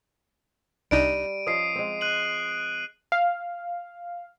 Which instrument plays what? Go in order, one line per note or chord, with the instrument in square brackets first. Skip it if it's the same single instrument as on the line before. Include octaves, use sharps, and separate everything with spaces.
[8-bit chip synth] C2 D4 D#4 [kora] G3 [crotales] D7 D#7
[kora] F3 C#4 D#5 [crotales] D#6 C7
[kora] G#3 C4
[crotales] F#6 D#7 F#7
[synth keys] F5